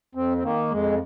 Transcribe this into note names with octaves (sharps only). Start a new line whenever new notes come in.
F2 C4
C4
D#3 A#3
F2 G#3